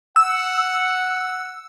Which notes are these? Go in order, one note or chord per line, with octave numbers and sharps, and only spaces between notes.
F#5 E6